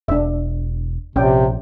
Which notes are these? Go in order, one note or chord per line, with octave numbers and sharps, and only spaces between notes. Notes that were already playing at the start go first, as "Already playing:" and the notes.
E1 D4 E5
A#1 C3 C#4 D5 G5